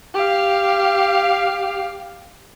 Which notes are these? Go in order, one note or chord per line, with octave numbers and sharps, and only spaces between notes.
G4 F5